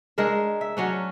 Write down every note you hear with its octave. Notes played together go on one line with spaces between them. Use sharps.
G#3 D4 A#4 E5
E5
F#3 C#4 D4